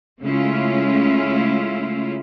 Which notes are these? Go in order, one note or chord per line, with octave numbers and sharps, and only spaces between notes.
C#3 G#3 A3 C#4 E4 F4